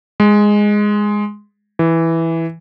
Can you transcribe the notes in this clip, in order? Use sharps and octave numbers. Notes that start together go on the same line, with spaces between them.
G#3
E3